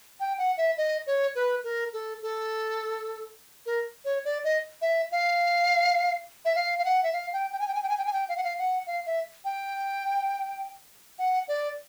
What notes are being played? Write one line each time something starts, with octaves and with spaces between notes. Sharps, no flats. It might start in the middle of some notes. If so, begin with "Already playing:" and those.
G5
F#5
E5
D#5
C#5
B4
A#4
A4
A4
A#4
C#5
D5
D#5
E5
F5
E5
F5
F5
F#5
E5
F5
G5
G5
G#5
G5
G#5
G5
G#5
G5
G#5
G5
F5
F#5
F5
F#5
F5
E5
G5
F#5
D5